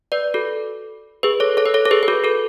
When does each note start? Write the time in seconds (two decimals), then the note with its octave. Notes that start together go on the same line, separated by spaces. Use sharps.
0.12 B4 D5
0.34 F#4 A4
1.23 G#4 B4
1.40 A4 C#5
1.57 A4 C#5
1.65 B4
1.74 A4 C#5
1.85 A4
1.91 G#4 B4
2.03 B4
2.08 F#4 A4
2.24 F#4 A4